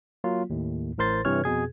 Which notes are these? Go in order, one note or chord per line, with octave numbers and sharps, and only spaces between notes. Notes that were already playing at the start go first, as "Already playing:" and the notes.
F#3 A#3 F4
D#2 A2
A1 A2 A#4 C5 C6 A6
G2 C3 E3 C#5 F6
F2 B2 G#4 G#6